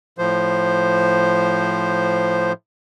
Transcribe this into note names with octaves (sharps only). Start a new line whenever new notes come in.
A2 F3 C5